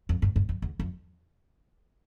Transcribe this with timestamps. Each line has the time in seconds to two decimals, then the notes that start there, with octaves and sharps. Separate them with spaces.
0.09 F2
0.22 G2
0.36 G2
0.49 F2
0.62 E2
0.79 F2